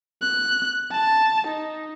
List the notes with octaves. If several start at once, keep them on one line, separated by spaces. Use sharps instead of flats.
F#6
A5
D#4